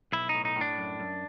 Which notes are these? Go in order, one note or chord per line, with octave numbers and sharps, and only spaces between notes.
B1 E4
D#4
A2
D#4
A2
D4
F#2
F#2